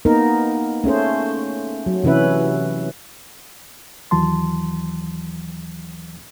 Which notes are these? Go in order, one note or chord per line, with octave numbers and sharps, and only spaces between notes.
A#3 B3 D#4 A#4
A3 C#4 G#4 C5
F#3
C3 E3 C#4 B4 E5
D#2 E3 F#3 A5 C6